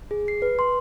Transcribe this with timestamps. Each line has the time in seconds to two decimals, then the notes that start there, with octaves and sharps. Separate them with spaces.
0.11 G#4
0.28 C7
0.42 B4
0.59 C6